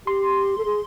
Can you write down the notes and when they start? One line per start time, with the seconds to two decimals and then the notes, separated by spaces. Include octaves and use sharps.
0.06 G4 C6
0.58 A4
0.65 G#4